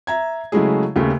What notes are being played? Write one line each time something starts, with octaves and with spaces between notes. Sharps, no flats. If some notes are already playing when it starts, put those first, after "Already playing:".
E5 A#5 G#6
C#3 F#3 G#3 A3 E4 G#4
D#2 C#3 A3